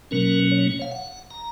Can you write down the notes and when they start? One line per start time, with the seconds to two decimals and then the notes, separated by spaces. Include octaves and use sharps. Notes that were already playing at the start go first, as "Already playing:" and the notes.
0.11 B2 F#3 A#3 C#4 A#4
0.51 C#5
0.82 F5
0.91 F#5
1.31 A#5